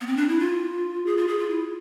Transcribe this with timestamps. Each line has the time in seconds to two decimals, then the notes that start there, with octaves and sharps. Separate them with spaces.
0.01 B3
0.07 C4
0.17 D4
0.29 E4
0.40 F4
1.06 G#4
1.17 F4
1.28 G#4
1.39 F4
1.50 E4